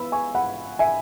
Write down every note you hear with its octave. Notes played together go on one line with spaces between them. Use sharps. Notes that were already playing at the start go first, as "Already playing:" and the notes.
Already playing: E3 B3 B5 E6
G#5 C#6
F#5 B5
E5 G#5